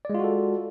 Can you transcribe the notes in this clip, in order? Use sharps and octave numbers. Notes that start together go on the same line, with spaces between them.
G#3 F4 F#4 A4 D5